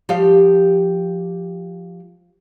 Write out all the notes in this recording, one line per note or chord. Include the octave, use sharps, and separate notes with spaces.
F3 G4 F5